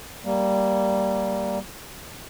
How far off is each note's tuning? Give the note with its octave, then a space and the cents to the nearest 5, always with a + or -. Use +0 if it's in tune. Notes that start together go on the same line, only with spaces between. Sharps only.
G3 -5 A#3 +0